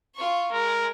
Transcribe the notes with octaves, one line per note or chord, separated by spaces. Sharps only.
F4 C#6
G#3 A#4